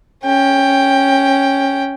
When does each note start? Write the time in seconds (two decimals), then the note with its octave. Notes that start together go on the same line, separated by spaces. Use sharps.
0.24 C#4 G5